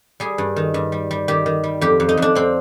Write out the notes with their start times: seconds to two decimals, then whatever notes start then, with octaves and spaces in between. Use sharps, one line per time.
0.20 G3 G#4
0.38 G2
0.56 D#3
0.74 G2
0.92 G3
1.11 G3
1.28 D#3 G4
1.46 D#3
1.64 G3
1.81 F2 G4
2.00 F2
2.09 D#4
2.17 F2 D4
2.35 F2 C4